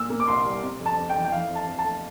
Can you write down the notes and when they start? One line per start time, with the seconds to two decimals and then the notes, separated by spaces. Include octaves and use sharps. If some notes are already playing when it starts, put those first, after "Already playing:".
Already playing: A#2 E6
0.10 A#3
0.20 D6
0.27 C2 C6
0.45 G3
0.63 C3
0.80 F2
0.86 A5
0.97 F2
1.10 G5
1.15 E3
1.25 G5
1.32 E3 F5
1.49 F2
1.55 A5
1.67 F2
1.78 A5
1.84 A3